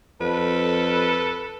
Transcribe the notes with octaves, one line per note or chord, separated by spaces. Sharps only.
F2 A4 B4